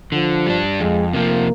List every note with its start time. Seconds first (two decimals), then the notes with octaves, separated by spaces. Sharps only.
0.12 D3 F3
0.46 G3 D4
0.80 F2 G#3
1.13 C3 F3 A#3